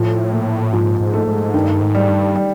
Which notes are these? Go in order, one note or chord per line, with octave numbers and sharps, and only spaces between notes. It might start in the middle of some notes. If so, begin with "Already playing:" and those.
Already playing: A2 F3
A#2
G#2 F3
G#2
A3
G#2
G2 D#3
G#2
G3
G2
G3